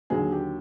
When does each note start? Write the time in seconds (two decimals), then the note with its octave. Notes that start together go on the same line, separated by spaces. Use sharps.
0.10 D#2 D3 F#3 G#4
0.32 G4